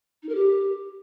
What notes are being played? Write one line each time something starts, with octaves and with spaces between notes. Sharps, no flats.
D#4
A#4
G4